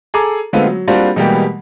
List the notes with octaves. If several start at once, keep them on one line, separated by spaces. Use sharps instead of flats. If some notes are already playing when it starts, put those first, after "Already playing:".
G#4 A4 A#5 D6
D3 G#3 A3 B3 C4 F4
F#3
G3 A#3 C4 D4 F4 F#4
B2 E3 G3 G#3 A#3 G4